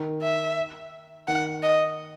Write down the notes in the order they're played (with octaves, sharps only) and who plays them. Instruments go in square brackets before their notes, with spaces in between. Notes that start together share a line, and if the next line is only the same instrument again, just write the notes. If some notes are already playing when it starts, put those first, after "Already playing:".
Already playing: [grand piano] D#3
[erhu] E5
[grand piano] D#3 [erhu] F#5
[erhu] D#5